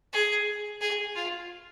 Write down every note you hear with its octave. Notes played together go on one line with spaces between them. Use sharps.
G#4
G#4
F4